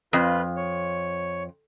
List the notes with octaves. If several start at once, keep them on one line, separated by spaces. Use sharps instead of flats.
F2 F4 B4
C#5